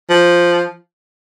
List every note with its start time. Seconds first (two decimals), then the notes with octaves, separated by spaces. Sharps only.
0.10 F3